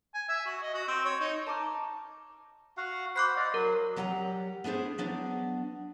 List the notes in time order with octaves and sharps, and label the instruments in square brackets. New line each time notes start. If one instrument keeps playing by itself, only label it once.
[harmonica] G#5
E5
F#4
D#5
F#4
C4
C#5
D#4
[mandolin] A5 A#5 D6 F6
[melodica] F#4 F5 F#5
[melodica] C5 F#5 B5 [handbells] D6 F#6 C7
[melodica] D5 D#5 F5
[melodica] F#3 [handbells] A#4
[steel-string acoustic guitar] F#3 G3 F#5 G5 A#5
B3 D4 E4 G#4 C5
F#3 B3 D4